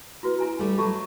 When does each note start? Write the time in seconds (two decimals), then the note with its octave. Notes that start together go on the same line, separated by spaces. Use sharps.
0.23 E4 F#4 B4
0.39 E4 G#5 A#5
0.59 G3 A3
0.78 F#3 A3 F4 A5 C#6